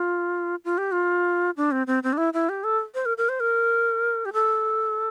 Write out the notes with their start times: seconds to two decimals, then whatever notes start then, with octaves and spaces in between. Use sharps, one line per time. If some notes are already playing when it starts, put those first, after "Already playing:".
Already playing: F4
0.65 F4
0.78 G4
0.92 F4
1.57 D4
1.71 C4
1.87 C4
2.03 C4
2.13 D4
2.18 E4
2.34 E4
2.49 G4
2.64 A4
2.95 C5
3.06 A#4
3.18 A#4
3.29 C5
3.40 A#4
4.25 G4
4.33 A4